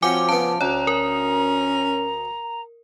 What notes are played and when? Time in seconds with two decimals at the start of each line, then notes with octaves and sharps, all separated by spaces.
0.03 F3 C4 C#4 F#4 G#5 D6
0.29 C#3 B3 A5
0.61 D2 C#4 C#5 A#5
0.87 A#4